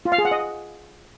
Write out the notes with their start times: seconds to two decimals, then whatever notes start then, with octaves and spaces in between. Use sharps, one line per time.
0.05 F4
0.12 F5
0.18 G#4
0.25 F#5
0.31 D#5